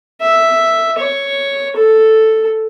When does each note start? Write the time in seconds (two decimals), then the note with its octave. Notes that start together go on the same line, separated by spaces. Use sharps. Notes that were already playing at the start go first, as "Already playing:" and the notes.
0.21 E5
0.98 C#5
1.76 A4